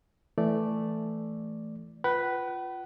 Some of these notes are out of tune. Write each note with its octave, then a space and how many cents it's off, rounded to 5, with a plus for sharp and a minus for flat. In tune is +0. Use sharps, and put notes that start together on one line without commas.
E3 +5 A3 +0 D5 +0
F4 +0 B4 +0 F#5 +45